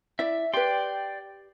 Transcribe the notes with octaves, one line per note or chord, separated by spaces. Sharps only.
E4 D5 E5
G4 B4 D5 G5 C6